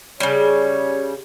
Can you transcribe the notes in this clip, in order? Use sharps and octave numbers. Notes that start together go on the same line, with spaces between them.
C#3 G3 C#5